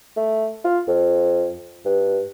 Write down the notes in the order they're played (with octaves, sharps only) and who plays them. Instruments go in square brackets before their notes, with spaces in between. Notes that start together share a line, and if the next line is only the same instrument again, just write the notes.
[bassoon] A3
F4
F2
G2